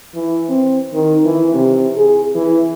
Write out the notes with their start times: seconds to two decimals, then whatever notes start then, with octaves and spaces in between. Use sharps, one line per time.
0.14 E3
0.49 C4
0.94 D#3
1.24 E3
1.54 C3
1.96 G#4
2.35 E3